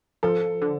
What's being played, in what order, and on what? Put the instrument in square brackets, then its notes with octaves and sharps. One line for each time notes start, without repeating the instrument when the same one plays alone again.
[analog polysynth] F3 [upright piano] A4
[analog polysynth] D3